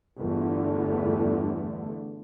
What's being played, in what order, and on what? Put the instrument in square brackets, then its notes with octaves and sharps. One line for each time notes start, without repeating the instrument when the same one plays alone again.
[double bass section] G1 E2 G2 D3 A3